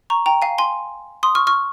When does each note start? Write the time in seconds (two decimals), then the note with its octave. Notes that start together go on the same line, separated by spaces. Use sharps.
0.10 A#5 C#6
0.26 G5 A#5
0.42 F5 G#5
0.58 G#5 C6
1.23 C6 D#6
1.35 C#6 F6
1.47 C#6 F6